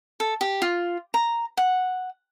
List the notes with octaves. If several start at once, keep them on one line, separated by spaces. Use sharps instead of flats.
A4
G4
F4
A#5
F#5